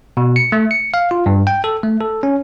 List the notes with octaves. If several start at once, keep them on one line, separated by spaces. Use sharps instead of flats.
B2
C#7
A3
C#7
F5
F4
G2
G5
A4
A3
A4
C#4